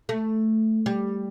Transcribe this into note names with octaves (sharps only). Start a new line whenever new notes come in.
A3
G3